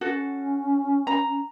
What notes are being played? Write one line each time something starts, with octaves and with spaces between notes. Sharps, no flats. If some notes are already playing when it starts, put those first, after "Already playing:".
C#4 F#4 A4
A#5